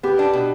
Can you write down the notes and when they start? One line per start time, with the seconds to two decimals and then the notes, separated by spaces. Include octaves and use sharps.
0.03 B3 G4
0.19 D4
0.33 B2